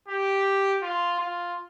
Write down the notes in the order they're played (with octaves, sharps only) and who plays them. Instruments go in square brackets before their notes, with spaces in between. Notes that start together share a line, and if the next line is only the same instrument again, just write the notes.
[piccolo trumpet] G4
F4
F4